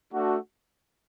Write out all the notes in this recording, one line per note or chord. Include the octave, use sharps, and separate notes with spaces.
A3 D4 F#4